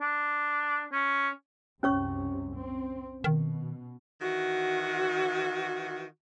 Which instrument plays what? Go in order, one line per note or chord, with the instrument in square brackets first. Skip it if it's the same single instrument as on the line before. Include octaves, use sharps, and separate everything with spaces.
[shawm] D4
C#4
[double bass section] C2 F#2 C3 [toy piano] C#4 C#5 C#6
[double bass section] C4
[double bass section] B2 [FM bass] D#3
[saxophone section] D#3 E3 F#4